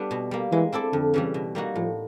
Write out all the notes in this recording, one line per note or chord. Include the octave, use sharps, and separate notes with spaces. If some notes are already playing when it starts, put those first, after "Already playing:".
Already playing: G3 B3 D4 A4
B2
G3 A#3
E3 G#3
C4 E4 A4 D5
F2 D3
C#3 E3 G3
B2
G3 A#3 D#4 F#4
A2 F3